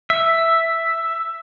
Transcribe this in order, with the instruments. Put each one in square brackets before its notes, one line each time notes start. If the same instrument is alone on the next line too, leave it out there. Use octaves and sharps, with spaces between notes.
[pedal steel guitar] E5